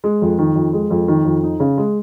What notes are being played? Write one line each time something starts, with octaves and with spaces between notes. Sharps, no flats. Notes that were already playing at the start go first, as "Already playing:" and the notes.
G#3
F2
D#3
F2
G#3
F2
D#3
F2
D#4
C#3
G#3